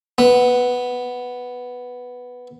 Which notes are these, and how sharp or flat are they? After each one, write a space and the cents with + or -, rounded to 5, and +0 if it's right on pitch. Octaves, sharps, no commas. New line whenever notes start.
B3 +0